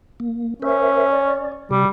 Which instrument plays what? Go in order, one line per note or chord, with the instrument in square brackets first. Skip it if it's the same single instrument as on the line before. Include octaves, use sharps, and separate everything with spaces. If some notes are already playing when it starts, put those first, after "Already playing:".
[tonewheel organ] A#3
[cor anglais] C#4 [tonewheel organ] A#4 C5 E5
[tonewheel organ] D5
[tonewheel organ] C3 G4 [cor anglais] G3